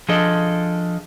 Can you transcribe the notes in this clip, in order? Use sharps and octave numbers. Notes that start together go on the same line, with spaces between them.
F3 D4 G#4 A4 D#5